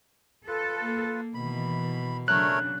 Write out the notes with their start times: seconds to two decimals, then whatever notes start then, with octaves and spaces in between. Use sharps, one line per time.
0.48 F4 A4 B4
0.81 A#3
1.34 B2 D#3 E3 B5
2.28 C#3 F#3 A3 D4 A#4 C#5 F#6